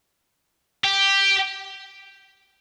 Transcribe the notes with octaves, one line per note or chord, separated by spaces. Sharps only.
G4